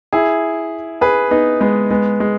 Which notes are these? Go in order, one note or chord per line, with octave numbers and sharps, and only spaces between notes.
E4 G#4
G#4 B4
B3 D#4
G#3 B3
G#3 B3
G#3